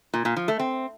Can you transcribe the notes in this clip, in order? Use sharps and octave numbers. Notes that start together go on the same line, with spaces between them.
A#2
A#2
F3
A3
C4